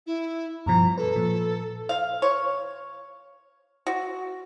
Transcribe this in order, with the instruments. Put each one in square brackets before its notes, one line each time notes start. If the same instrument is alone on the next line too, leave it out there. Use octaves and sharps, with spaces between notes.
[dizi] E4
[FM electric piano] G2 B2 F3 [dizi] A#5
[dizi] A4 [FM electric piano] B4
[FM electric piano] A#2 F3
[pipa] F5
C#5
F#4